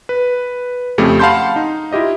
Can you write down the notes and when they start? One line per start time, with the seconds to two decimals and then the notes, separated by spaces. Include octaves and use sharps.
0.09 B4
0.98 F2 C#3 A3 G4 G#4
1.19 F5 F#5 A5 B5 C6 G6
1.56 D#4
1.92 E4 F4 G4 D#5 E5